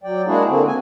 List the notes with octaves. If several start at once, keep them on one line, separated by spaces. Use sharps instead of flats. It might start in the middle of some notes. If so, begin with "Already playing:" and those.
F#3 D5 G5
G#3 A#3 D4 E4 F#4 G#4
D3 A#3 C4
G#5